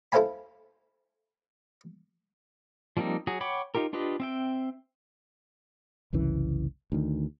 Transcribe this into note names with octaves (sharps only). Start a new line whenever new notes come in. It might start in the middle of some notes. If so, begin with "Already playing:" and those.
E4 A4 C5 F5 G#5 B5
F3 G3 A#3 C4 D#4
F#3 F#4 G#4
C#5 F#5 G5 B5 D6
D#4 F4 G4 A#4
D4 F4 G4 B4 D#5
C4 E5 G5
F#1 C2 C#3 E3
D2 D#3